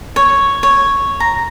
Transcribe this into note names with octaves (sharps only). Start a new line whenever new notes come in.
C#5
C#5
A#5